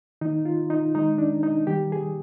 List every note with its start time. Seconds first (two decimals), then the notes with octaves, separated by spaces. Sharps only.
0.21 D#3 A#3 D#4
0.45 F4
0.70 D#4
0.95 D#3 G#3 D#4
1.18 D4
1.43 D#4
1.67 D#3 G3 A#3 G4
1.92 G#4